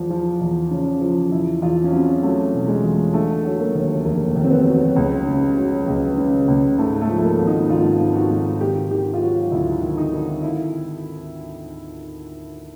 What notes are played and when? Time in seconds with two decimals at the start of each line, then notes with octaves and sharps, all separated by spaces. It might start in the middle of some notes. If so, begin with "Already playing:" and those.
Already playing: E2 F3
0.10 F3
0.41 E2
0.71 C#3
1.01 F3
1.32 E2 E4
1.62 E2 F4
1.84 C#4
1.92 F#3 C4
2.23 F#3 A3
2.53 B2
2.68 G#3
2.84 E2
3.14 D3 A3
3.45 F#3
3.59 A#3
3.75 D#2
4.05 F1 A#3
4.36 D#2
4.44 C4
4.51 B3
4.66 F#3
4.96 C#2
5.26 C#3
5.57 F#3
5.88 C#2
6.18 C#3
6.48 C#2
6.78 G#2 A3
7.01 A3
7.09 F3
7.18 A3
7.24 A#3
7.39 G#1
7.47 D#4
7.70 G#1 F4
8.00 G#2
8.15 F#4
8.30 G#1
8.61 D#3 G4
8.91 D#3 G4
9.14 F4
9.21 F#3 F#4
9.51 D2 E4
9.82 D#3
9.97 D#4
10.12 D#3
10.43 E4